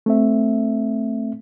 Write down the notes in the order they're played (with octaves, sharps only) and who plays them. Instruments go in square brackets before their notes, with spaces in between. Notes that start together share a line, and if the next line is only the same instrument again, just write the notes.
[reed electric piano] A3 C4 E5